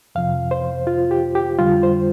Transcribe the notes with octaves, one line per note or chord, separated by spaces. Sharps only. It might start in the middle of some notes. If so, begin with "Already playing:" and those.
F2 C3 F3 F5
C5
F4
G4
G4
F2 D3 G3 F4
C5